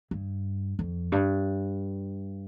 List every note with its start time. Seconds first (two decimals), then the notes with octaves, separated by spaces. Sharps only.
0.11 G2
0.79 F2
1.12 G2